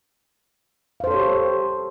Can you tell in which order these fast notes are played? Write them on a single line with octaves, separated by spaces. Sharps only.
F5 C5 A4 C#5 G4